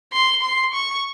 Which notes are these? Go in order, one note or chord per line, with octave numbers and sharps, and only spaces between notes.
C6
C6
C#6